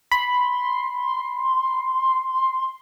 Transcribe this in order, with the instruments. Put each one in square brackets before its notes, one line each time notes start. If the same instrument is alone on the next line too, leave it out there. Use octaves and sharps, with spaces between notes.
[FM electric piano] B5 [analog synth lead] C6